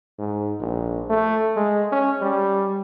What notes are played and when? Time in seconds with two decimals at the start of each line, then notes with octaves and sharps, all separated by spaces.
0.19 G#2
0.61 A#1
1.10 A3
1.57 G#3
1.92 C#4
2.22 G3